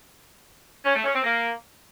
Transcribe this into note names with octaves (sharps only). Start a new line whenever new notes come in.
C#4
A3
C#4
C4
A#3